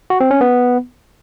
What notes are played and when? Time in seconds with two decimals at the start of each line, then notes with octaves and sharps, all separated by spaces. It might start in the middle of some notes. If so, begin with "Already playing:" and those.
0.10 F#4
0.20 C4
0.31 C#4
0.41 B3